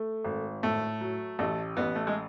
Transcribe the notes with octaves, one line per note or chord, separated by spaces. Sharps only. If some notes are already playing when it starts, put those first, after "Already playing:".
Already playing: A3
G#1
A2 A3
F#3
A1 A3
A1 B3
A3
G#3